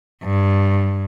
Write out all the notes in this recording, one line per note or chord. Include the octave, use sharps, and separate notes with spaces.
G2